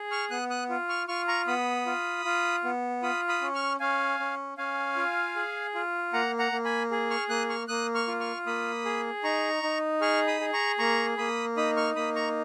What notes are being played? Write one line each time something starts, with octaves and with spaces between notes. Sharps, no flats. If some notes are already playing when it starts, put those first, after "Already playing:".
Already playing: G#4
C#6 F6
B3 D#6 F#6
D#6 F#6
F4
C#6 F6
F4 C#6 F6
A#5 C#6
B3 B5 D#6
F4
F4
B3
F4 B5 D#6
B5 D#6
C#4
C#6 F6
C#4 F5 G#5
C#4
C#4 F5 G#5
F4
G#4
F4
A#3 F#5 A#5
F#5 A#5
A#3
G#5 B5
G#4
C#6 F6
A#3 D#6 F#6
C#6 F6
A#3 D#6 F#6
C#6 F6
F4
C#6 F6
A#3 B5 D#6
G#4
D#4 A#5 C#6
D#4
G#4 C#6 F6
B5 D#6
G#4
A#5 C#6
A#3 A#5 C#6
A#3 B5 D#6
D#4 B5 D#6
C#6 F6
A#3 B5 D#6
A#5 C#6